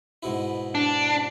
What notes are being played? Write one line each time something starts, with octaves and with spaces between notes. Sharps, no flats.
G#2 B2 E4
D4